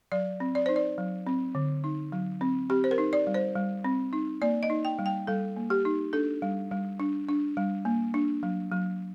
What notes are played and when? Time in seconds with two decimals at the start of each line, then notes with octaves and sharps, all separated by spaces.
0.12 F#3 D5
0.40 C4
0.55 D5
0.66 D#4 C5
0.76 D5
0.98 F#3
1.27 C4
1.55 D3
1.84 D#4
2.12 F#3
2.41 C4
2.70 C4 G4
2.84 C5
2.91 A#4
2.98 D#4
3.13 D5
3.27 G3
3.34 C5
3.56 G3
3.85 C4
4.13 D#4
4.42 A#3 D5
4.63 D#5
4.70 D#4
4.85 G5
4.99 G3
5.06 G5
5.27 G3 A4
5.56 A#3
5.70 G4
5.85 D#4
6.13 D4 A4
6.42 G3
6.71 G3
7.00 D4
7.29 D4
7.57 G3
7.85 A#3
8.14 D4
8.43 F#3
8.72 F#3